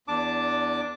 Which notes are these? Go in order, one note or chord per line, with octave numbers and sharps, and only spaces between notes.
E2 D4 A5 D6